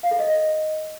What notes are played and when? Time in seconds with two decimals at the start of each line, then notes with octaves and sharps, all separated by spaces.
0.03 F5
0.11 A4
0.19 D#5